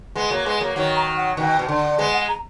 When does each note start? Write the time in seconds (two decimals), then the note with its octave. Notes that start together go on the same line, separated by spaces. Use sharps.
0.15 G#3 B3
0.30 F#3 A#3
0.46 G#3 B3
0.61 F#3 A#3
0.76 D#3 F#3
0.96 A#5
1.17 F#5
1.37 B2 D#3
1.59 B2
1.68 D3
1.98 G#3 B3
2.14 F#5
2.29 A#5